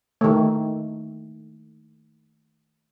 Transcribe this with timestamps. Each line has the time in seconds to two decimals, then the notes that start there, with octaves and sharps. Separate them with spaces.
0.21 D#3 A3